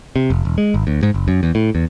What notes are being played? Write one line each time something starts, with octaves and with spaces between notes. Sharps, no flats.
C3
F1
E1
G#3
G#1
D2
G#2
F#1
F#2
E2
A2
E2